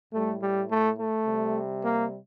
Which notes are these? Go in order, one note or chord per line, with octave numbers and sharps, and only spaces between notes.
A2 G3 A3
G3
A3
A3
C3 G3
A#3